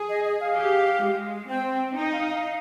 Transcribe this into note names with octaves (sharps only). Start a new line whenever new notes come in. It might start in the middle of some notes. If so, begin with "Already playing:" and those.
Already playing: G#4
D#5
D#5
F5
G4
G#3
C4 G5
D#4 G5
F5
F5